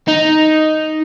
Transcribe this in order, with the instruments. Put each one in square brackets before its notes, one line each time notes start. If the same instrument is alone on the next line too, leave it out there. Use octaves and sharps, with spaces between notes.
[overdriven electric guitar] D#4